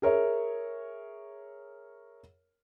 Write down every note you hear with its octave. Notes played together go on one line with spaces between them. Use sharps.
G#4 A#4 C#5 E5